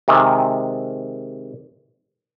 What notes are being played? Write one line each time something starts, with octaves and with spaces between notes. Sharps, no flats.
C3 D#3 G#3